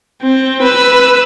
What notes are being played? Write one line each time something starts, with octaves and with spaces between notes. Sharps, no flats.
C4
B4 E6